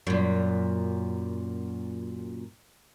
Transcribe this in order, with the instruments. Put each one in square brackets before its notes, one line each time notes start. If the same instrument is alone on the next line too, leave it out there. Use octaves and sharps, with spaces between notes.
[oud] F#2 A#2